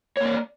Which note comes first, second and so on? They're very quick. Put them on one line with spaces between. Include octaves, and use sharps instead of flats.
C#5 A#3 D5